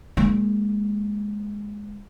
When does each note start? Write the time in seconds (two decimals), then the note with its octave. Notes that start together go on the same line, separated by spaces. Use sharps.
0.17 G#3 A#3